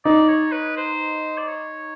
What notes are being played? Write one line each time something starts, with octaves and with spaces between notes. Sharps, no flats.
D#4 D5
C#5
B4
C5
D5
C#5